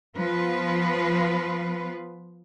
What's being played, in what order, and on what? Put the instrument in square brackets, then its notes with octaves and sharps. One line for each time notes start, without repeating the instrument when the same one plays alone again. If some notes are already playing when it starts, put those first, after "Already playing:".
[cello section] F3 B3 F4 B4